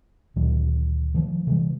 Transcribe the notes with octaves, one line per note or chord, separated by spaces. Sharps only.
D2 A#2 D#3 F#3
D#3 F3 A3
C3 E3 G3 G#3